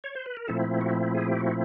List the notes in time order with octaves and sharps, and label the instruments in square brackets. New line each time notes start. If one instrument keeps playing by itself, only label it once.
[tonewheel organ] C#5
C5
B4
A#4
A#2 F3 A3 C4 E4 A4
F#4
G#4
G4
F#4